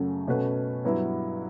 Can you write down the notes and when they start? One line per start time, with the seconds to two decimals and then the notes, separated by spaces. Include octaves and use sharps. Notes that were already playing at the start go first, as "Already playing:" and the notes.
Already playing: F#2 C#3 F#3 A3 C#4
0.27 B2 A3 C#4 F#4 B4
0.84 G2 F#3 B3 E4